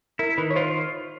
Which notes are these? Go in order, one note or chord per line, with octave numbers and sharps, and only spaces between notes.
E4 A#4
D#3 B4
C#5
F4 C5